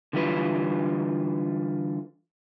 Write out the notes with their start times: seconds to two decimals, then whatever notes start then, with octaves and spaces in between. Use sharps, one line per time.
0.13 D3 E3 G3 F4 B4